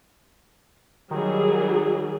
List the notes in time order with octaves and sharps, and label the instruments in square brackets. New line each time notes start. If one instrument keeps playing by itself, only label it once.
[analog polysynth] D#3 [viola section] F#3 G3 G#4